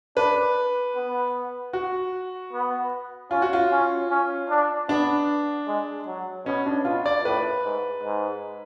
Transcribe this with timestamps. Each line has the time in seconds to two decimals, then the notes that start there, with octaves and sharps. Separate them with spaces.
0.17 D4 B4
0.96 B3
1.73 F#4
2.53 B3
3.31 C#4 F4
3.42 F#4
3.53 F4
3.71 C#4
4.10 C#4
4.50 D4
4.89 B3 D4
5.67 G#3
6.07 F#3
6.46 B2 C#4
6.66 D4
6.85 B2 F4
7.06 D5
7.24 A2 B4
7.64 G#2
8.04 G#2